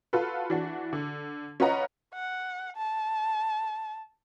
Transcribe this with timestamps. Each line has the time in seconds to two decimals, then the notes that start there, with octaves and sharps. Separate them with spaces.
0.13 F4 F#4 A4 B4
0.50 E3 D4 F#4
0.93 D3
1.60 C#4 F4 B4 D#5 F#5 A#5
2.14 F#5
2.76 A5